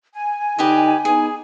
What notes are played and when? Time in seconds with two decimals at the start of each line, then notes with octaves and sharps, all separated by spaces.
0.13 G#5
0.59 D3 D#4 G4 B4 D#5
1.05 B3 D#4 G#4